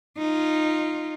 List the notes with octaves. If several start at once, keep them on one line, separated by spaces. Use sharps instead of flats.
D#4 F4